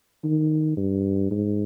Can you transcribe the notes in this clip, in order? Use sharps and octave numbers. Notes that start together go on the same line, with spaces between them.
D#3
G2
G#2